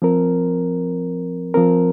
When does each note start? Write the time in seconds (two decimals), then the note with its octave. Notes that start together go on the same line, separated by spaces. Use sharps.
0.02 F3 C4 A#4
1.54 F3 C4 A#4